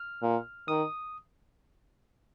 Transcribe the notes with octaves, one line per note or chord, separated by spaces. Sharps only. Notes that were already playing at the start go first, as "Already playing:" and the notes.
Already playing: F6
A#2
D#3 D#6